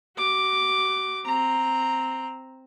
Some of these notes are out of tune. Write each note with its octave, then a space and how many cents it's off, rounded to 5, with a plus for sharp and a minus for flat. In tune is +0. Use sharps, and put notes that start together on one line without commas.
F#4 +35 D6 +0
C4 +0 A#5 -5